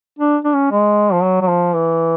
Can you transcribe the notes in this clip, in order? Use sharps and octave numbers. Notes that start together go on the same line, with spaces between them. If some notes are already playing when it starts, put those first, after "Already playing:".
D4
D4
C#4
G#3
F3
F#3
F#3
F3
E3